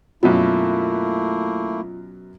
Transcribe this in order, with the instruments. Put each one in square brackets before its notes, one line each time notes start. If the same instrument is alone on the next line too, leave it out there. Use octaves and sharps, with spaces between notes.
[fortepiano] F#2 B2 F#3 [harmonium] A3 A#3 E4 [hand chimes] F4